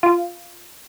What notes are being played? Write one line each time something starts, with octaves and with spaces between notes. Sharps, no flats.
F4